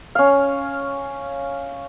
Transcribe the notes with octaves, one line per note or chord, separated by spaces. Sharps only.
C#4 F5